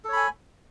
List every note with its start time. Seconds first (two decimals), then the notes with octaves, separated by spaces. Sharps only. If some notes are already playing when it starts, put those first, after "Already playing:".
0.05 A4
0.09 C#5
0.13 B5
0.17 G#5